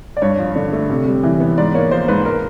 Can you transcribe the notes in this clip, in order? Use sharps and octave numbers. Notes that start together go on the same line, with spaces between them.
D5
G2 C#5
F3
D3
A3
C3
G3
E3
B3
G#2 D5
A#3 C#5
F3 C5
G#2 B4
A#4